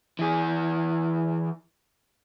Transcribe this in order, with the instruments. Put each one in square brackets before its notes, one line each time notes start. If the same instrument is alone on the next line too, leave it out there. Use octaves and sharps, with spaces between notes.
[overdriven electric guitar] E3 G#4